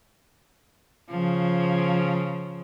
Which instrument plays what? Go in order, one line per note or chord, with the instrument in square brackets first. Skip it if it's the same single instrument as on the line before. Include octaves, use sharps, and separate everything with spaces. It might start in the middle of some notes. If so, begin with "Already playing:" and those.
[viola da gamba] C#3 F3